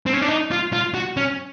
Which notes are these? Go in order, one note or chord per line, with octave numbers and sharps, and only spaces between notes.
C4
C#4
D4
D#4
F4
F4
F#4
C#4